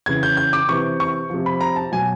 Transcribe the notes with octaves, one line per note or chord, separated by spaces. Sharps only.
C#3 E3 G#6
G6
G6
D6
C3 E3 C#6
C#6
C3 F3
B5
A#5
A5
B2 F#3 G#5